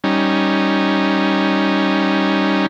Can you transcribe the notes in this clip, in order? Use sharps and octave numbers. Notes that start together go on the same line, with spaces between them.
G3 C#4 D#4